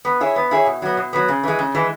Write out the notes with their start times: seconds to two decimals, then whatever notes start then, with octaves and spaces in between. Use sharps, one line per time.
0.05 B3
0.20 E4 G#4 C#5
0.36 B3
0.51 E4 G#4 C#5
0.66 B2
0.82 F#3 B3
0.97 B2
1.13 F#3 B3
1.28 C#3
1.43 E3 G#3
1.59 C#3
1.75 E3 G#3